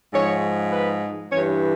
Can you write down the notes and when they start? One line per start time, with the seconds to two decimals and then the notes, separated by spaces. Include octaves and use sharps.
0.13 G#2 F3 C#5
0.71 B4
1.31 G2 E3 C#5